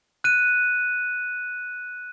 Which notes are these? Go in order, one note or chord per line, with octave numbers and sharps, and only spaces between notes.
F#6 D#7